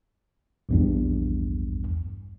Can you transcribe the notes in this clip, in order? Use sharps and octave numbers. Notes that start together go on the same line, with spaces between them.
A#1 E2 G2